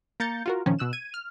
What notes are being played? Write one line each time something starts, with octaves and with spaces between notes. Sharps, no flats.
A#3 A#5 G6 A6 C#7
F4 F#4 A#4
A#2 D#3 F3 C#4
B2 E6 F#6 E7
G#6 D#7
F6